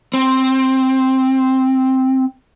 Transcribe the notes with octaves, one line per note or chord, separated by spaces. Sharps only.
C4